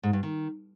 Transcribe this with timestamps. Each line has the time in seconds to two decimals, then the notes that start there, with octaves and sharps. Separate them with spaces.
0.03 G#2
0.13 G2
0.23 D#3